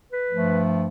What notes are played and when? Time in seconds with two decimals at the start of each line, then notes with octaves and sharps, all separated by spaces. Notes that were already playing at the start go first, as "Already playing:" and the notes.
0.12 B4
0.31 G2 F3 A3